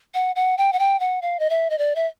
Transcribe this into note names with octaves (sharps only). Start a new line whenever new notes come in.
F#5
F#5
G5
F#5
G5
F#5
F5
D#5
E5
D#5
D5
E5